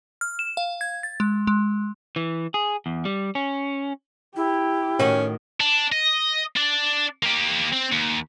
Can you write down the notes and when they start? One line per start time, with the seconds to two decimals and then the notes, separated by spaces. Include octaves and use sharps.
0.21 F6
0.39 E7
0.57 F5
0.81 G#6
1.03 A6
1.20 G#3
1.47 G#3
2.16 E3
2.54 G#4
2.86 E2
3.05 G3
3.35 C#4
4.36 E4 G4
4.99 A2 D#3 C#4 F#4
5.60 D4
5.92 D#5
6.56 D4 D5
7.23 A#3 G4
7.72 C4
7.92 D#2